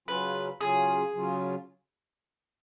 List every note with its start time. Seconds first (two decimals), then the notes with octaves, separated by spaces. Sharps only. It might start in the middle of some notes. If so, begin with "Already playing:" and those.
0.08 C#3 F#3 C#4 F4 B4
0.61 C#3 F#3 C#4 F4 G#4
1.13 C#3 F#3 C#4 F4